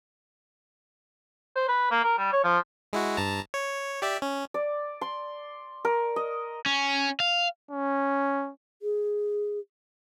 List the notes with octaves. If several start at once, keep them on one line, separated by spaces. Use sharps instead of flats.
C5
B4
A#3
A#4
G3
C#5
F3
G#3 E4 F#4
G2 A5 A#5
C#5
G4 D5 E5
C#4
D5
C6
A#4
D#5
C#4
F5
C#4
G#4